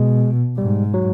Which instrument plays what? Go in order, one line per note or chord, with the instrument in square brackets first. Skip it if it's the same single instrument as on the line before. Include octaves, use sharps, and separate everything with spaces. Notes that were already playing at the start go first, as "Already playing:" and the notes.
Already playing: [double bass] B2 [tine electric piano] G#3
[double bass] G#2 [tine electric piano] G3
[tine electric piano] F#3